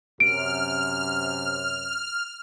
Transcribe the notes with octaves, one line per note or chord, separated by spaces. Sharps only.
F#2 C3 F6 D7